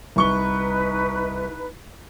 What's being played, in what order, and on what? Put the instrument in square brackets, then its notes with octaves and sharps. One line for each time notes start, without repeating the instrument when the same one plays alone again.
[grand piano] C2 C#6 G7 [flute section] D#4 B4